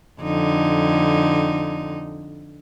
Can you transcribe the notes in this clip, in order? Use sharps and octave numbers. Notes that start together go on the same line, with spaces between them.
F2 D3 D#4